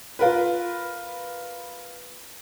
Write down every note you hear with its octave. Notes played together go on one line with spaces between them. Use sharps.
F4 A#4 B4